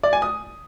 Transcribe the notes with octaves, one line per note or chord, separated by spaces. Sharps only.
D5
G#5
D#6